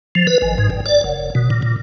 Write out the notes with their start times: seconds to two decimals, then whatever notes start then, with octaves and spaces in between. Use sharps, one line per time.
0.15 F3
0.27 B4
0.42 G#1
0.58 G#2
0.70 G1
0.86 D5
1.04 F#1
1.35 B2
1.50 A#2
1.62 A#2